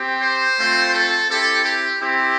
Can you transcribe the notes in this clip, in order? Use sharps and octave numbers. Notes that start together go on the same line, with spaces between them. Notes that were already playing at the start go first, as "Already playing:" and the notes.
Already playing: C4 G4
C5
A3 C4 F4
A4
C4 E4 G4 A4
G4
C4 E4 G4